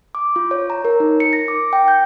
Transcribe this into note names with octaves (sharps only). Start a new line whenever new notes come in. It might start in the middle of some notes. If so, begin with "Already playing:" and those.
D6
F4
C#5
A#5
A#4
D#4
C#7
A#6
D6
G5
G6